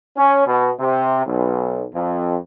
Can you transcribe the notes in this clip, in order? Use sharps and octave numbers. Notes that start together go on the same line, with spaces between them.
C#4
B2
C3
B1
F2